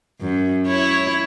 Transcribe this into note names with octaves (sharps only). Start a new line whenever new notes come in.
F#2
E4 C#5